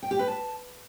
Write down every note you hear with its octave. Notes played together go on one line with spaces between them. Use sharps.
G5
G4
B4
A5